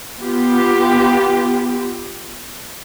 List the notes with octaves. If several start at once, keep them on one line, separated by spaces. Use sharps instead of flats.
B3 F4 G4